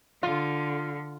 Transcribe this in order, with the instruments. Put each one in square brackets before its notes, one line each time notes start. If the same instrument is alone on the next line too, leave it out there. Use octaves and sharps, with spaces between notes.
[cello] D3 [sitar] F4